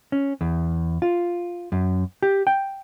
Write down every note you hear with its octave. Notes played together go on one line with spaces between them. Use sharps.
C#4
E2
F4
F#2
G4
G5